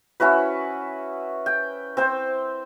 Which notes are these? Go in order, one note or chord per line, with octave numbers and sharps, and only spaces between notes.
C#4 E4 F#4 B4
G5
C4 C5 G5